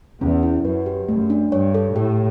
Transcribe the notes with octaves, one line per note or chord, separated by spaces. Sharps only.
E2 C#4
E4
F#2 B4
G4
F#2 A3
D4
G2 C#5
A4
A2 G4